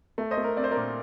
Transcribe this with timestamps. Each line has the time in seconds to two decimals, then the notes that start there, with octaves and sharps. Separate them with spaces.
0.18 A3
0.31 C5 D#5
0.38 A3
0.44 A#4
0.57 C4 D5
0.64 C5
0.71 A#4 D5
0.77 A#2